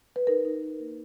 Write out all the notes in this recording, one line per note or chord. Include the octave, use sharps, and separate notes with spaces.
B4
D#4 A#4
D#4
D#4
A#3